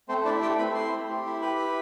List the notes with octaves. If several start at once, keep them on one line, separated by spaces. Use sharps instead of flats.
A3 C4 C5
D4 E4 D5
A3 G4 G5
C4 B4 B5
E4 C5 C6
A3
G4
E4
G4 B4 B5
E4